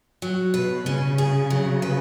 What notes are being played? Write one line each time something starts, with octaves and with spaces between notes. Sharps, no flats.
F#3
B2 B4
C#3 C#4
G#4
F#3
B4